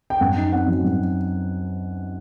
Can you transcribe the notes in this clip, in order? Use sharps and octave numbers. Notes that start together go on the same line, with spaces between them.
G5
F#2 F#5
D#4
C4 F#5
F#3
F#2